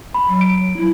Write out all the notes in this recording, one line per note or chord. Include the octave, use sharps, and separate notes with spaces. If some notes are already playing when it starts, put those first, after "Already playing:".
B5
F#3
D7
E4